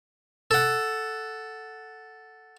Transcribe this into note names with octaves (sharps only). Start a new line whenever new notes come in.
A4 F#5